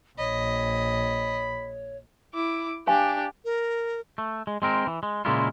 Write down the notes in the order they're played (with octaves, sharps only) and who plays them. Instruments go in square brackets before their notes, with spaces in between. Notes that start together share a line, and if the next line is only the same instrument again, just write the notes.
[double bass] A#1 [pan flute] C#5 [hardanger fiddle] D#5 [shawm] B5
[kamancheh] E4 D6
[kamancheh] D4 G4 [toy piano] F5 G#5 C#6
[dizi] A#4
[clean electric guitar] A3
G#3
G#3 C4 A#4
E3
G#3
A#2 C#3 G#3 A#3 E4 F4